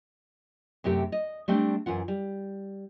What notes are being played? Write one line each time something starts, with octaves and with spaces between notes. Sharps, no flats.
F#2 C3 A3 G4
D#5
G3 A3 C4 D4
F#2 E3 F4 F#5
G3